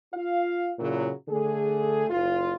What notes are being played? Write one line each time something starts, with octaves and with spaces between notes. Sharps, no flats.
F4 F5
A#2 C#3 F#3 E4
D3 A3 G#4
F#1 F4